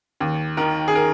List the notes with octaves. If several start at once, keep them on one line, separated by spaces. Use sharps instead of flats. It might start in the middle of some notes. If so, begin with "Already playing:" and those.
D#2
D#3 A#4
G#4
A#4